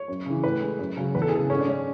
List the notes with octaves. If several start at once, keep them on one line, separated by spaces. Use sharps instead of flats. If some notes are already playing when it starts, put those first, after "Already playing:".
Already playing: C#5
F#2
C#3 E3
A2 B4
G#3
F#2
C#3 F#3
E2 B4
A4
G#4
C#3 E3 A4
G#2 C#4
D4
G#3 C#4